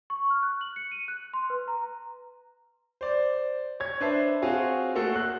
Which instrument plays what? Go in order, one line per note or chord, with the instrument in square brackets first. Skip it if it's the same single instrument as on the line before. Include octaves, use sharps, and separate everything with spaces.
[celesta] C#6
F6
F#6
F#7
C#7
D#7
F#6
C6
B4
A#5
[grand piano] C5 D5
C#5 G#6
D4 B4 C5 E5 A5 C7
C4 F4 F#4 G#4 C#5
A3 A#3 F#4 G#4 A4
F#6